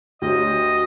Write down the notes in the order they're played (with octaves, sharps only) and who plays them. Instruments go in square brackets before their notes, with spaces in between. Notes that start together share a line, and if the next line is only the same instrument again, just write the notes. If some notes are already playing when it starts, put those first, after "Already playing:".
[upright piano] D2 [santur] F#3 G4 [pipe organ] D#5